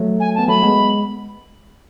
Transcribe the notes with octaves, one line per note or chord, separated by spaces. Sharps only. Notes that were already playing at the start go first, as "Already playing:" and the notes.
Already playing: F#3 A3
G#5
B3 A5
F#3 A3 B5
G#3 B3